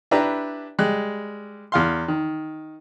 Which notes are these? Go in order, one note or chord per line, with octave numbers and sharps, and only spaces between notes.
D4 E4 G4 B4 A#5
G3 G#3 F#6
E2 F5 C6
D#3